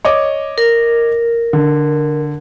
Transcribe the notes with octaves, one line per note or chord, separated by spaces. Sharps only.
C#5 D#5 D6
A#4
D3